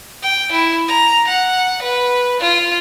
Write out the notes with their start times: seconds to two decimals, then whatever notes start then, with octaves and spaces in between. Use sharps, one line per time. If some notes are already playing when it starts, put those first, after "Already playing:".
0.22 G5
0.52 E4
0.88 A#5
1.27 F#5
1.82 B4
2.40 F4